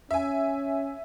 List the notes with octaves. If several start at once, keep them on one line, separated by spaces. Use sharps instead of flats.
C#4 E5 G#5